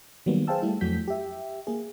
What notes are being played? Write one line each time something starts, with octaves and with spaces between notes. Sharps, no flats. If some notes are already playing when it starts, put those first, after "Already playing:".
D#3 F#3 G3 A#3 B3
G#4 C5 F5 G5 A5 E6
G3 A3 E4
F2 F#3 A3 F#4 G6 B6
G4 E5
A#3 G#4